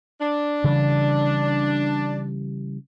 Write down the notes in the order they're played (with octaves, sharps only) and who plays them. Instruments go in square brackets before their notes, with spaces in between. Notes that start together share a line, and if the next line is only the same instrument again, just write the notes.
[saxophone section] D4
[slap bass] C#3 E3 G3